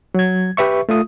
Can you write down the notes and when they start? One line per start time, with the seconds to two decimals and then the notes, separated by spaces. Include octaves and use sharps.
0.14 F#3 G#6
0.57 G4 B4 E5 C#6
0.89 A3 F4 D#6